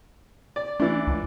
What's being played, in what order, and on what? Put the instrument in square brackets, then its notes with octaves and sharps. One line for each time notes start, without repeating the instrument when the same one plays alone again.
[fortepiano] D5
[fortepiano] E3 D4 [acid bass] A3
[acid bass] C#2